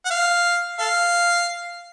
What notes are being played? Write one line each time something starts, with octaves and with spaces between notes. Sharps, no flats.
F#5
F5
A4 F5